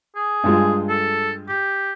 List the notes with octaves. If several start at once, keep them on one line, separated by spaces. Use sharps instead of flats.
G#4
G2 G#3 F4
A4
G4